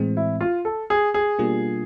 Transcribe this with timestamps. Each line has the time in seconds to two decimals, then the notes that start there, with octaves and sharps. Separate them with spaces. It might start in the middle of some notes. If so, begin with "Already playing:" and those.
Already playing: A2 E3 G#3 C4
0.17 E4
0.41 F4
0.65 A4
0.90 G#4
1.14 G#4
1.39 B2 G3 A#3 D4 F4